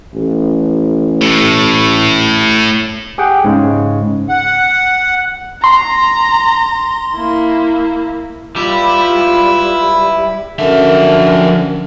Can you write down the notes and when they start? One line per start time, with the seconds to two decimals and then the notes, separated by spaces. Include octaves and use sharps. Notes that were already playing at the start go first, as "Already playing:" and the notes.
0.14 A1
1.21 A2
3.18 G4 G#4 F#5 G5
3.44 G#2 C#3 G#3
4.29 F#5
5.64 A#5 C6
7.15 A#3 E4
8.56 G3 E4 F4 B4 E6
10.59 F#2 D3 F3 A#4 E5